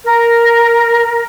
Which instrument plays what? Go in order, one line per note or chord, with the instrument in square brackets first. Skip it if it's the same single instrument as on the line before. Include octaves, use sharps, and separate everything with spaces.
[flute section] A#4